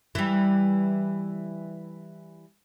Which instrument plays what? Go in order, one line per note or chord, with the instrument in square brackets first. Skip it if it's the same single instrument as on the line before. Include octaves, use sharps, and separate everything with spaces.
[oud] E3 G3